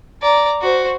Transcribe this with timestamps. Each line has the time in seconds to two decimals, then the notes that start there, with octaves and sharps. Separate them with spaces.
0.22 D5 A#5
0.61 F#4 C5